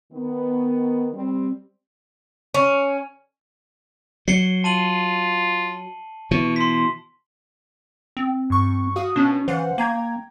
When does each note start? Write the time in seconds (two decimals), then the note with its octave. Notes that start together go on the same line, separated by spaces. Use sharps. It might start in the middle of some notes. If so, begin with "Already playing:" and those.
0.12 D#3 B3
1.13 G3 C4
2.54 C#4
4.28 F#3 C7 C#7 G7
4.64 F4 A5 D#7 F#7
6.31 B2 E3 C#6
6.56 C5 C6 B6
8.17 C4
8.50 G2 C#6
8.96 F#4 F5 D#6
9.16 B2 C#4 D4
9.48 E3 C5 F5 F#5
9.78 A#3 G5 A#5 G#6